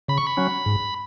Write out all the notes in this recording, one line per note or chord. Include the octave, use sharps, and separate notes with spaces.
C#3 B5
C#6
B5
F#3 C#4
G#2